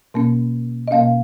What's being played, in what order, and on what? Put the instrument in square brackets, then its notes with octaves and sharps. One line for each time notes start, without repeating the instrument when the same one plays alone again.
[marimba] B2 A#3 C#4
D#5
B2 A#3 C#4 F5